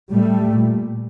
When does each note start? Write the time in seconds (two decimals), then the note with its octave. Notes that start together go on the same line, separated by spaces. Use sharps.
0.11 A2 G3 A3
0.51 A#2